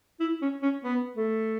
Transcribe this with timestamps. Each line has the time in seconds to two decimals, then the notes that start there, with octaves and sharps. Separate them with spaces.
0.20 E4
0.42 C#4
0.62 C#4
0.84 B3
1.17 A3